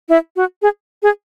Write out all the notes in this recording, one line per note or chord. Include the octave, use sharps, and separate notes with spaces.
E4
F#4
G#4
G#4